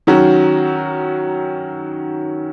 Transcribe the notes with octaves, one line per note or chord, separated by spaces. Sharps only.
D#3 F#3 C#4 F#4